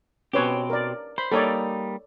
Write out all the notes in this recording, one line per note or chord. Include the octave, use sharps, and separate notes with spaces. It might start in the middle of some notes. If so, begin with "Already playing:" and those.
B2 C4 C#4 G4 B4 C#5
A#4 D5
C5 B5
G3 A#3 D#4 A4 C#5 D5